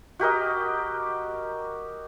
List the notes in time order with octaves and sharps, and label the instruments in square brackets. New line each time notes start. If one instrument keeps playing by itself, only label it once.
[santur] F#4 G4 A#4 D#5